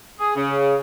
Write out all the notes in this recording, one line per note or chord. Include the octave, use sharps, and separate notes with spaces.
G#4
C#3